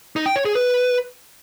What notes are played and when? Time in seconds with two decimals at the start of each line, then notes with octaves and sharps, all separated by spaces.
0.16 D#4
0.26 G5
0.36 C#5
0.45 G#4
0.55 B4